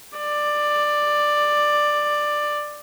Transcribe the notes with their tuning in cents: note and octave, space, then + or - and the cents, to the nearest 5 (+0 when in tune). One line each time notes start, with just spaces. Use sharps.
D5 +10